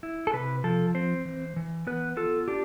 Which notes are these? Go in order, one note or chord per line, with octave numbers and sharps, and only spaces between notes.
E4
A4
C3 B4
F3 A4
C4 C5
E3
E3
B3 B4
F4 A4
D4 G4